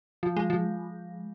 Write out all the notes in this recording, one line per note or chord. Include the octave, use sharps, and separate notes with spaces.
F3
G#3
F3